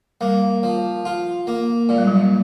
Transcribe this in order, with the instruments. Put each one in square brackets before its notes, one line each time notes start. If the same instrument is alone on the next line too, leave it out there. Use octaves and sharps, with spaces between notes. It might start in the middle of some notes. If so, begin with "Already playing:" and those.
[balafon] G3 [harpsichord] A#3
[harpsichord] F3
F4
A#3
[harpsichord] A#2 [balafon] G#3
[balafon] G3
F#3
G3